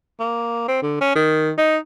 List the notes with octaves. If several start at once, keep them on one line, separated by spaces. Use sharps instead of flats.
A#3
C4
D3
C#4
D#3
D#4